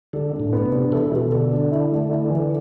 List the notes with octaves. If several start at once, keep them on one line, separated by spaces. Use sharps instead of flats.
D3 A4
D4
A2
B3
C3
D4
E3 A4
B2
D3 A4
D4
E4
A3
E4
E3